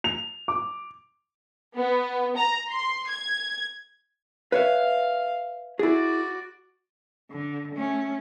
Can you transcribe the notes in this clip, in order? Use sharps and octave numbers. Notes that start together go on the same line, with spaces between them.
F7
D6
B3
A#5
C6
G#6
B4 C#5 E5 F5
E4 F#4 G#4 D5
D3
A3 C#4